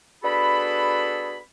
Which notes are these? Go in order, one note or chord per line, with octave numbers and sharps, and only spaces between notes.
B3 D4 F#4 G#4 A4 B5